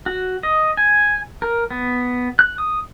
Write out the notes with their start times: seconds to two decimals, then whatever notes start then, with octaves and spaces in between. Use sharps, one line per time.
0.06 F#4
0.43 D#5
0.77 G#5
1.42 A#4
1.71 B3
2.39 F#6
2.58 D#6